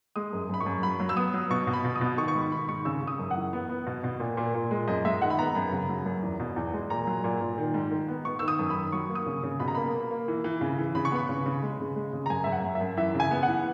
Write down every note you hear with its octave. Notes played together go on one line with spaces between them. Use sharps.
G#3 D#6
F#2
F#2 B5
C#6
F#2
F#3 B5
F#3
E6
B3 D#6
F#3
B2 C#6
B2
B5
B2
D#6
B2
D#3 C#6
C#6
G#2 B5
D#3 B5
G#2 C#6
C#3 E6
C#3
D#6
F#2
F#5
E3
B3
B3
B2
B2
A#2
A#2
A#2
G#3
F#2 D#5
G#3 E5
D#3 F#5
B5
B3 A#5
F#2 B5
C#3
F#3
F#2
E2
B2
E2
G#3
A#2 A#5
F#3
A#2
A#2
D#3
G#2
D#3
B3
B3 C#6
D#3 E6
D#6
F#2
B5
D#3
F#3 C#6
A#3
D#6
C#3
C#3
B2 B5
A#5
A#3 B5
A#3
A#3
E3
E3
C#3
E3
C#3 B5
C#6
B3 B5
C#3
C#3
G#3
C#3
G#3
C#3
A#5
F#2 G#5
F#2 E5
F#5
F#2
E5
F#2
E3 E5
C#3
G#5
B3
F#5
E3